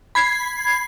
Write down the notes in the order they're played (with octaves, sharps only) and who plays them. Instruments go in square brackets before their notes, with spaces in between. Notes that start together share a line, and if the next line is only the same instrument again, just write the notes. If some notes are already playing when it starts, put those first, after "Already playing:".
[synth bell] B5 G#6 C7